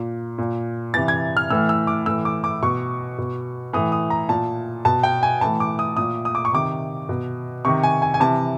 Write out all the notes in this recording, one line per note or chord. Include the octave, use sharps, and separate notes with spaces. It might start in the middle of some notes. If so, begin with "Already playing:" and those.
Already playing: A#2
A#2
C3 E3 A6
G#6
F6
A2 E3 E6
E6
D6
A2 E3 E6
D6
D6
B2 C#6
B2
A2 E3 D#6
D#6
A#5
A#2 A5
B2 A5
G5
G#5
A2 E3 A5
D6
D#6
A#2 D#6
D#6
D6
C#6
C3 D#3 D6
B2
C3 D#3 C#6
G#5
G#5
G#5
C3 E3 A5